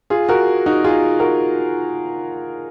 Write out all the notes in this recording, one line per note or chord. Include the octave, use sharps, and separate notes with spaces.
F4 G#4
F#4 A#4
D#4 F#4
F4 G#4
F#4 A#4